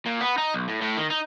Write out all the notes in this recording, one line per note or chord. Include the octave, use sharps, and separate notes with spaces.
A#2
B3
D#4
B1
A2
A2
D#3
D#4